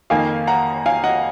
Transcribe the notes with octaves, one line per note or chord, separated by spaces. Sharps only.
F2 D#3 A#3 F5 G#5
F#5 A#5
F5 G#5
D#5 F#5